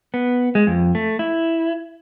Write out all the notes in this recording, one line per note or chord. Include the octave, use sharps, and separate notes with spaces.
B3
G#3
F2
A3
E4